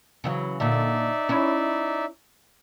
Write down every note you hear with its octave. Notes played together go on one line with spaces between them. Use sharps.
C#3 E3 F#3
A#2 D3 D#4 D5 E5
C#4 E4